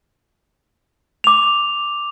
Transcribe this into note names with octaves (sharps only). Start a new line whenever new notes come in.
D6 F7